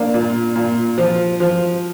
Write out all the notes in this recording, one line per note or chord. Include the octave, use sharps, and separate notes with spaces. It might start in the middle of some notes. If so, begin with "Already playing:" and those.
Already playing: A#3 D4
A#2
A#2
F3
F3